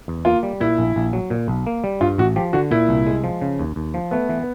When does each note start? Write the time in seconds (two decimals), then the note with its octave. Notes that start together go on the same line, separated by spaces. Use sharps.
0.08 E2
0.25 A#3 F4
0.43 G3
0.60 A#2 E4
0.78 A#1
0.96 A#1
1.13 F#3
1.30 A#2
1.48 B1
1.66 A#3
1.84 G3
2.01 G2 F4
2.18 A1 F#4
2.36 F3 G4
2.53 D3 F#4
2.71 A#2 E4
2.89 C2
3.07 G#3
3.24 F3
3.42 C#3
3.59 D#2
3.76 D#2
3.94 F3
4.11 A3 B3
4.29 E3